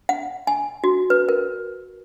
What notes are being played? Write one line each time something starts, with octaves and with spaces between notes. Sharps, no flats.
F#5
G#5
F#4
B4
A#4